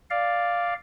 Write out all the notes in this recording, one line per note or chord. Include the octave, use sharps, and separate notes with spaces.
D5 F5